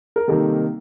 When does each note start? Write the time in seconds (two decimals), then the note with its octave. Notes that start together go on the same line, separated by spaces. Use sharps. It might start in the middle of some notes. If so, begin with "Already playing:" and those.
0.16 A#4
0.28 C3 D#3 G3 A#3 A4